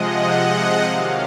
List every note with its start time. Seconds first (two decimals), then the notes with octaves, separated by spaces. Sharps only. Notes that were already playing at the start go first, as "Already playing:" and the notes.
Already playing: C3 F3 G#3 D#5 F#5
0.84 C3 D#3 F#3 F5